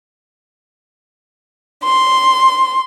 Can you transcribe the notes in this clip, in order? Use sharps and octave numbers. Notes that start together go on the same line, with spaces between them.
C6